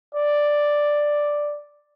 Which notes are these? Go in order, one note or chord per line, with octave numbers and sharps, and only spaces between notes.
D5